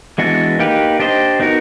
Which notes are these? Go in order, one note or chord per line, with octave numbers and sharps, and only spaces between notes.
E3 G#3 B3 D4 F#4
A#3 D#4 G4 B4
D4 G4 C5 D#5
B3 D#4 F#4 A#4